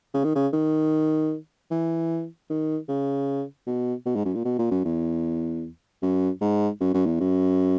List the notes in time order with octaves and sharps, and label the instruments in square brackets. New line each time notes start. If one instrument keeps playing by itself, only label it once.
[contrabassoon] C#3
D#3
C#3
D#3
E3
D#3
C#3
B2
B2
G#2
F#2
A#2
B2
A#2
F#2
E2
F#2
G#2
F#2
F#2
E2
F#2